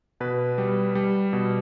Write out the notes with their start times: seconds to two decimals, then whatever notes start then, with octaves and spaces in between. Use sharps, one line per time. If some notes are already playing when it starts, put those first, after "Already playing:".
0.20 B2 B4
0.58 G3
0.95 G3
1.33 B2